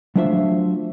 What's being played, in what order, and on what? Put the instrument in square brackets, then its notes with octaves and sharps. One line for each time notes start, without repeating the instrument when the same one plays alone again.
[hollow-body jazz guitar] F#3 A3 D4 F4 C5 E5